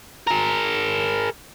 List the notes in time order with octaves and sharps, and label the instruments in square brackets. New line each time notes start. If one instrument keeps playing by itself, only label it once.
[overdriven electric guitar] G#4 A#4